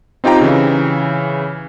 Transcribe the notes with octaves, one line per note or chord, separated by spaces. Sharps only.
C4 D#4 F4 G4 G5 A#5
C#3 E3